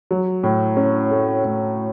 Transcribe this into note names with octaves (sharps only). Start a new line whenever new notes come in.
F#3
A2
C#4
A3
A2